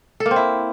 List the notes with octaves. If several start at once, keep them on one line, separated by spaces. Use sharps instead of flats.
A4
A#3
C4
E4